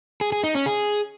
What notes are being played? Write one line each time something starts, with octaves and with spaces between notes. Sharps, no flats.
G#4
G#4
D#4
C#4
G#4